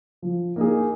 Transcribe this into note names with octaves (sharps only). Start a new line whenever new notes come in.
F3
A#3 D#4 G#4